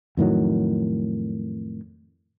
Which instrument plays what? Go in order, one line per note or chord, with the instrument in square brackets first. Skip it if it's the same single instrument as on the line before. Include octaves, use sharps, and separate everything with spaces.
[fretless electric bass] F2 A2 D#3 F#3